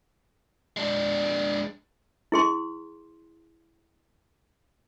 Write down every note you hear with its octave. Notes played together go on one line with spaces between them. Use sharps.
G#3 D4
E4 G#4 C6